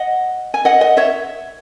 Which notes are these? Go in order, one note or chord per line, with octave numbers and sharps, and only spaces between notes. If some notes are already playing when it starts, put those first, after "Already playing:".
Already playing: D#5 F#5
G#5
D#5 F#5
D#5 F#5
C#5 E5